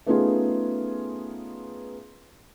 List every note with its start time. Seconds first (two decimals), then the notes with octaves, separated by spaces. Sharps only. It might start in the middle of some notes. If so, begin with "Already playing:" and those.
0.06 A3 B3 C#4 D#4 F4 G#4